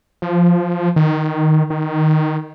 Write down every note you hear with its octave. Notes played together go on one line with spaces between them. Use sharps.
F3
D#3
D#3